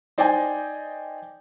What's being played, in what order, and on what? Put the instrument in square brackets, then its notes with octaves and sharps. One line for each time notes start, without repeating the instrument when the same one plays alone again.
[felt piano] D#4 C5 D5 D#5 G5 G#5